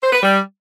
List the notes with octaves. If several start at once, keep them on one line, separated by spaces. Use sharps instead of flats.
C5
B4
G3